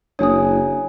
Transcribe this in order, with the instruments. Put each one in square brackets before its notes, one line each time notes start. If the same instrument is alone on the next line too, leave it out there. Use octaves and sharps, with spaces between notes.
[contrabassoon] F#1 [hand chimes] D4 E4 G#5 [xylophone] C#5 D#6